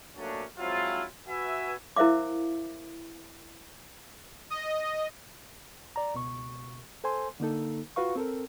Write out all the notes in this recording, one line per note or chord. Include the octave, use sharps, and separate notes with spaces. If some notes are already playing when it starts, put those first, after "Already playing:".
A#2 F#3 A3 A#3 C#4 D4
F3 F#3 G#3 C4 E4 F4
F#4 B4 E5 G#5
E4 A#4 C5 E5 F5 D6
D#5
D5 A#5
C#2 B2 C#6
A4 C5 G#5 C6
D3 A#3 D#4 A4
F4 F#4 B4 F5 C#6
C4 A4 A#4